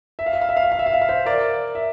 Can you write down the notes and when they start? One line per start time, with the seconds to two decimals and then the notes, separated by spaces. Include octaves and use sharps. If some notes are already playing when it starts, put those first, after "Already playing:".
0.19 E5
0.26 F5
0.33 E5
0.41 F5
0.49 E5
0.57 F5
0.64 E5
0.72 F5
0.79 E5
0.86 F5
0.94 E5
1.02 F5
1.09 C5 E5
1.26 A#4 D5
1.75 E5